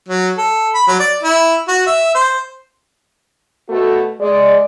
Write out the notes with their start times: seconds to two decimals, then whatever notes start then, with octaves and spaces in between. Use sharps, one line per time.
0.09 F#3
0.38 A4
0.75 B5
0.88 F#3
1.00 D5
1.23 E4
1.68 F#4
1.87 E5
2.15 C5
3.70 B2 A3 F#4 A4
4.20 G#3 D5